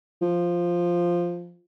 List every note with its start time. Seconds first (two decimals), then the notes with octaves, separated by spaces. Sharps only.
0.22 F3